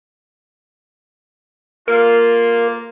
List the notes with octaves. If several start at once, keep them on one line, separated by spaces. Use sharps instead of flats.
A#3 F4 A#4